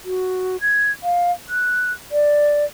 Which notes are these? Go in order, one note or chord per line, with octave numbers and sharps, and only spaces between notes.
F#4
G#6
F5
F#6
D5